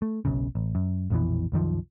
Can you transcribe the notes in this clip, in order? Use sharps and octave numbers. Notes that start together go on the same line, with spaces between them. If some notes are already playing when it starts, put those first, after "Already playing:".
A3
F#1 B1 F#2 C#3
A1
F#2
A#1 F2 B2 E3
C2 F#2 D#3 F3